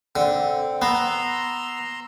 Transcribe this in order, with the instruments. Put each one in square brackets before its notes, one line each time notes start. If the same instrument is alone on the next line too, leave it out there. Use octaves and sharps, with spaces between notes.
[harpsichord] D3 [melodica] C4
[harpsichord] B3 [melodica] A#5 C6 E6